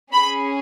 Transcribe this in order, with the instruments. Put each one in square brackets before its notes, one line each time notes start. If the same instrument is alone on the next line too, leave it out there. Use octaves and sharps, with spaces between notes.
[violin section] C#4 G#4 B5